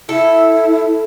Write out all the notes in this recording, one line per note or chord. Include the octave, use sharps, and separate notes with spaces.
E4 A4